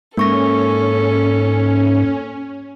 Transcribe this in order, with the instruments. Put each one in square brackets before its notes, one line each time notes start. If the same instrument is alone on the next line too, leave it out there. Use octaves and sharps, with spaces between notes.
[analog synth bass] G#2 [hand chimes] A#3 C#6 A#6 [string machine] C#4 [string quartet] A4